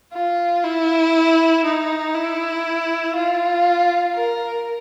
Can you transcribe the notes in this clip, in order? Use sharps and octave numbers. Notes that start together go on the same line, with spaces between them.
F4
E4
D#4
E4
F4
A#4